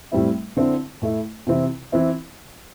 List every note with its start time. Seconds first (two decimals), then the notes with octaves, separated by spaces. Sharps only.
0.12 A2 G3 C4 E4
0.57 D3 C4 E4
1.02 A2 A3 E4
1.47 C3 E3 C4 E4
1.92 E3 C4 E4